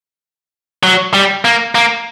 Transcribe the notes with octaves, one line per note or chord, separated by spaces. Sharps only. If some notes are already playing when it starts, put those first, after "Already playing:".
F#3
G3
A#3
A#3